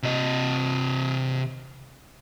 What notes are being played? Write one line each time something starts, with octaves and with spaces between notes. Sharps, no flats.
C3 D#5